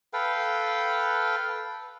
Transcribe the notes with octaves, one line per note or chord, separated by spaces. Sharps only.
A4 B4 F5 G5